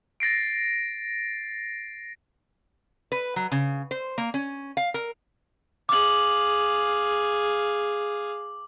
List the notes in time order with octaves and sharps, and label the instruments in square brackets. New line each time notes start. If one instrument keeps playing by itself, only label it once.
[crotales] A6 A#6 C7 D7
[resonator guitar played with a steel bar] B4
F#3
C#3
C5
A#3
C#4
F5
A#4
[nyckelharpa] G#4 F5 [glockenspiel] D6 F#7